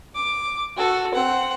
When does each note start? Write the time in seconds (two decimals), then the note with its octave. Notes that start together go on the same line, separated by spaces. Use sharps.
0.15 D6
0.77 F#4 A4
1.14 C4 F#5